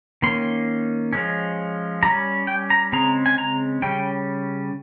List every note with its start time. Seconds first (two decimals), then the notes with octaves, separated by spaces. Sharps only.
0.22 D#3 A#3 C#4 C6
1.13 F3 G#3 C#4
2.03 G3 A#5
2.07 C#4
2.47 G5
2.70 A#5
2.92 C#3 G#3 C4 A#5
3.26 G#5
3.38 A#5
3.82 C#3 G3 C#4 G5